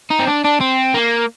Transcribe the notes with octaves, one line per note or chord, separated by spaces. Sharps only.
D#4
C4
D4
D4
C4
A#3